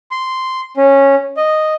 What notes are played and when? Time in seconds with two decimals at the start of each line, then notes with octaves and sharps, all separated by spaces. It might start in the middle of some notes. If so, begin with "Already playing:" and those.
0.11 C6
0.77 C#4
1.37 D#5